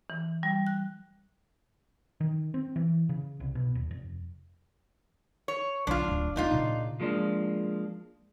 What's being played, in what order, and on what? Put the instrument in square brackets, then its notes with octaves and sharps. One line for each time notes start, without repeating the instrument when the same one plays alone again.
[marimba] E3
G3
F#6
[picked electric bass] D#3
C4
E3
C#3
C2
B2
D#1
F1
[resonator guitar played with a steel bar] C#5
[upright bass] B1 D3 [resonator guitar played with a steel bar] D4 F4
[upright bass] D1
[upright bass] D#2 C4 [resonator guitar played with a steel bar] D4 D#4 F4
[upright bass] A#2 C#3
[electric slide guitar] F3 G#3 A#3 D4